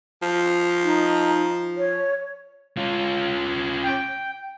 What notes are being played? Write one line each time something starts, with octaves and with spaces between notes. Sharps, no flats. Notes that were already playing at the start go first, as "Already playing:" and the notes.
F3
D#4
C#5
C#4 F4
G5